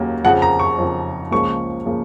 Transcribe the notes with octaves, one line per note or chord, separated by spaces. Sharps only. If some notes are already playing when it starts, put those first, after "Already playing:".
Already playing: D#2 C#3 F#3 A#3
F2 C#3 F3 F#5
A#5
C#6
F2 C#3 F3
C#2 C#3 F3 A#3 C#6
C#3 F3 A#3